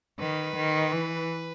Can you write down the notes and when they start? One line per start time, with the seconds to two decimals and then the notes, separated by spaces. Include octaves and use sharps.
0.19 D#3 B4
0.56 D#3
0.92 E3